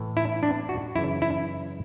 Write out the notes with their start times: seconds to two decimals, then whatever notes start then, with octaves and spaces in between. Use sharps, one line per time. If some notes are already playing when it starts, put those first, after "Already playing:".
Already playing: A2 E3
0.17 E4
0.43 D4
0.69 F#4
0.95 F#2 C#3 E3 E4
1.22 E4